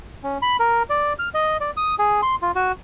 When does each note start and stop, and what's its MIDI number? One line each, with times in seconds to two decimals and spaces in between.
0.23 0.38 61
0.42 0.57 83
0.60 0.83 70
0.90 1.13 74
1.19 1.29 89
1.34 1.57 75
1.61 1.71 74
1.77 1.95 87
1.99 2.21 68
2.22 2.35 84
2.42 2.51 65
2.55 2.72 66